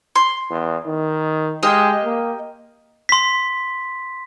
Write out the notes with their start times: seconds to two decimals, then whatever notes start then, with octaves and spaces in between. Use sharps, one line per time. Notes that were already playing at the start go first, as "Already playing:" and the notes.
0.16 C6
0.50 E2
0.86 D#3
1.63 G#3 G4 D#5 F5
2.04 A#3
3.09 C6 B6